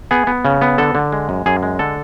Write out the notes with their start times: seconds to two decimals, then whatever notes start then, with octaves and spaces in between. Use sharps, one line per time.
0.11 B3 G#4
0.27 B3
0.45 C#3
0.61 B3
0.78 D3 A4
0.95 D3
1.12 G#3
1.29 F#2
1.46 F#2 G#4
1.63 G#3
1.79 D3 A4